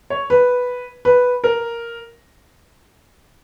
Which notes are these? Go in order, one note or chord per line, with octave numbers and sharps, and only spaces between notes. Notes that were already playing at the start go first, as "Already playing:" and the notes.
C#5
B4
B4
A#4